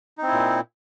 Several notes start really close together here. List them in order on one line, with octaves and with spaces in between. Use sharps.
D#4 C4 E4 A#2